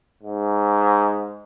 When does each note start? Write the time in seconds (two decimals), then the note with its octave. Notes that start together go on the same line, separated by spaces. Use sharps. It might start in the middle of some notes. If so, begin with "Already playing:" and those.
0.23 G#2